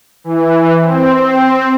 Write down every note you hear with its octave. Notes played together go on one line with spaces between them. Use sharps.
E3
C4